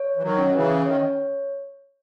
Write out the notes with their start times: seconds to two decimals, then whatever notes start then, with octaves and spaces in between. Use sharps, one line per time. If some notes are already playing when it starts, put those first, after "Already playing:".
Already playing: C#5
0.16 E3
0.22 D#3 F#3
0.38 C#4
0.47 D#3
0.54 C#3 E3
0.86 D#3 C#5